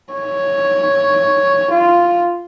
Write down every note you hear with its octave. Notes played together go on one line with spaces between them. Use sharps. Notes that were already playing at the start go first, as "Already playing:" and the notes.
C#5
F4